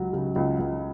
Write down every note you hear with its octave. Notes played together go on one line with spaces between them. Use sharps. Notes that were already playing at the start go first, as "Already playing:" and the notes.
Already playing: C#2 F#3
C#3
C#2
C#2